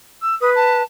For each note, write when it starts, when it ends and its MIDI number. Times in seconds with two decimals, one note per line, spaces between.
0.22 0.35 88
0.41 0.82 71
0.41 0.50 87
0.55 0.82 81